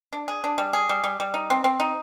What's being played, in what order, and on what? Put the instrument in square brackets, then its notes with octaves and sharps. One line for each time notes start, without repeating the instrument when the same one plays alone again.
[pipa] D4
G#4
D4
G3
G#4
G3
G3
G3
D#4
C4
C4
D#4